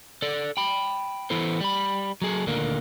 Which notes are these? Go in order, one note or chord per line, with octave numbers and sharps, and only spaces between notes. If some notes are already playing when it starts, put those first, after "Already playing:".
A4 D5
G5 B5
E3 B3 E4 A4 C5
G3 B5
F#3 G#4 A4
D2 A#2 D3 D#3 A#3